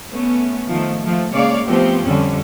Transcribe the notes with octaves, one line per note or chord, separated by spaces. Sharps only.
A3 B3 C#4
D#3 F3 A3
F3 A3
C#3 G#3 A#3 C#5 D5 F5
F3 A3 B3 C4 G4
F2 D3 G3 C#4